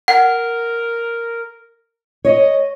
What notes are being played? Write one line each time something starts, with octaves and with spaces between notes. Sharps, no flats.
A#4 F#5
C#5 D#5